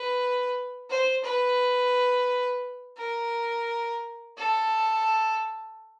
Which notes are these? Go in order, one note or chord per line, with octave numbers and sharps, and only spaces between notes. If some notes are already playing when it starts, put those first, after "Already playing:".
Already playing: B4
C5
B4
A#4
A4